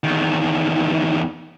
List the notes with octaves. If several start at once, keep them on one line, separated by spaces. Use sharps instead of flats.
E2 D#3